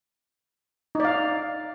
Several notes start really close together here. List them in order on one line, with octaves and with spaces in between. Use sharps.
D#4 D5 F5